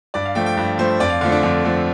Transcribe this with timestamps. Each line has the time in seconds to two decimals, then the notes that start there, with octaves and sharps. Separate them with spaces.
0.14 G2 D5
0.25 F5
0.35 F3 A3 G5
0.46 G5
0.57 G2
0.78 F3 A3 C5
1.00 F2 D5
1.10 F5
1.21 D3 F3 A3 F5
1.32 D4
1.42 F2 D4
1.64 D3 F3 A3